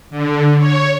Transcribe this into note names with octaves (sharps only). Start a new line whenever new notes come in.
D3
C#5